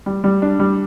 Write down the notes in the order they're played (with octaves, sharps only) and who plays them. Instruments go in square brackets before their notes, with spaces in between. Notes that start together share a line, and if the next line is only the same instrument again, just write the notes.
[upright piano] G3
G3
D4
G3